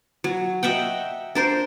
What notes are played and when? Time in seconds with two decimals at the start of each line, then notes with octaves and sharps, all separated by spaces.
0.24 F#3
0.63 D#5 E5 F#5 G5
1.35 D4 A#4 C5